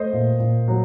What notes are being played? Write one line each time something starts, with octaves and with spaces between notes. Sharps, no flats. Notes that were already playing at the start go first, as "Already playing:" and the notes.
Already playing: A3 C5 D#5
A#2
A#2
F#3